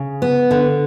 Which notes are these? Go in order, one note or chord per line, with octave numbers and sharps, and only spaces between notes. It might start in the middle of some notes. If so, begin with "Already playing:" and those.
Already playing: C#3
B3
D3